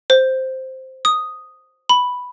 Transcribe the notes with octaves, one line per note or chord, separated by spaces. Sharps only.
C5
D#6
B5